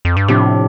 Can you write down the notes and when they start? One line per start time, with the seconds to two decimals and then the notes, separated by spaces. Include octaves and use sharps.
0.05 F2
0.17 G2
0.28 A2 C3 F3 D4